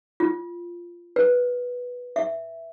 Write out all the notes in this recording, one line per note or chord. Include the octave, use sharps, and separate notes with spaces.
F4
B4
E5